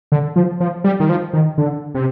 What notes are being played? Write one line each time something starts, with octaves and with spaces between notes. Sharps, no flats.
D3
F3
F3
G3
D#3
F3
D#3
D3
C3